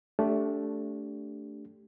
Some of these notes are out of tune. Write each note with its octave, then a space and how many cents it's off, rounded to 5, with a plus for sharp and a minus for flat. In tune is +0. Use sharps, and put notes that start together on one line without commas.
A3 +0 D4 -25 G4 +0